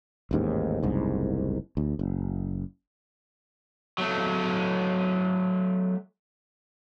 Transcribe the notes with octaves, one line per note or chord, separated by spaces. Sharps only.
A1 D#2 G#2
F#1 C2 G#2
D2
F#1
F#3 A3